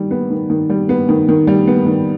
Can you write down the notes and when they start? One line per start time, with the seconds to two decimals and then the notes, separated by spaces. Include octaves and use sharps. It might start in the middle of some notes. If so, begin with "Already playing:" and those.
Already playing: D#3 G3
0.11 B3
0.30 D#3
0.50 D#3
0.70 G3
0.89 B3
1.09 D#3
1.29 D#3
1.47 G3
1.67 B3
1.86 D#3